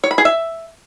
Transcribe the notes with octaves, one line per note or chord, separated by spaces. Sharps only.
C#5
B5
G#4
E5